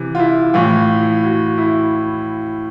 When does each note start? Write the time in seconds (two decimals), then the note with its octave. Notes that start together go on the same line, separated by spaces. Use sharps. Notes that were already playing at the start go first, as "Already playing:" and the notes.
Already playing: C3 E3
0.15 F4
0.19 E4
0.54 A2 E3 F4
1.23 F#4
1.58 E4